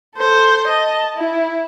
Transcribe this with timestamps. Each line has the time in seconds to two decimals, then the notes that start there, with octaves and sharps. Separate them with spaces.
0.16 A4 C5
0.67 D#5 A5
1.17 E4